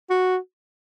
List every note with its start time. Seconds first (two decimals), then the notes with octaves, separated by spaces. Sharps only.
0.10 F#4